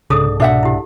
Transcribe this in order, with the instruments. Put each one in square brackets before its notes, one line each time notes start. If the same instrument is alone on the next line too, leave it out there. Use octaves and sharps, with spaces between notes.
[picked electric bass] C2 G#2 [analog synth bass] C#3 [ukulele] D4 [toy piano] G#4 A4 D#6
[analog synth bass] B2 [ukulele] D4 E5 F#5
[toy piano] E4 G4